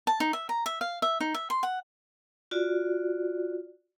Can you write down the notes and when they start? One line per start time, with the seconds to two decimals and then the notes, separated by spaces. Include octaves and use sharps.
0.07 A5
0.20 D#4
0.33 E5
0.49 A#5
0.66 E5
0.81 F5
1.02 E5
1.21 D#4
1.34 E5
1.50 C6
1.63 F#5
2.51 F4 F#4 D5